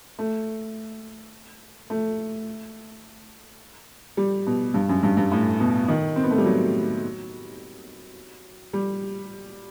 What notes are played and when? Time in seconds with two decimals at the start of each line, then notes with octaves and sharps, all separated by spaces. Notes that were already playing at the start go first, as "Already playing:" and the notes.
0.19 A3
1.90 A3
4.17 G3
4.47 B2
4.74 G2
4.89 F#2
5.03 G2
5.17 G2
5.32 A2
5.60 B2
5.88 D#3
6.16 C4
6.23 B3
6.30 A3
6.38 G3
6.45 F#3
8.73 G3